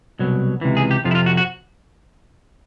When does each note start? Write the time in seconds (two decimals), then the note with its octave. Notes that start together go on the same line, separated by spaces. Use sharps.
0.19 C2 B2 F#3
0.61 C#2 C3 E3
0.77 G#4
0.91 G4
1.04 F2 C3 F3 F4
1.11 E4
1.15 F4
1.26 F#4
1.37 F#4